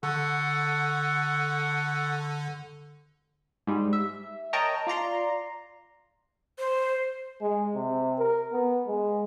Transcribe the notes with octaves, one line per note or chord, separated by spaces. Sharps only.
D3 A4 F#5 C#6
G#2 G3
E5
A#4 C#5 D#5 G5 A5 A#5
F4 D5 A#5 C6
C5
G#3
C3
A#4
B3
G#3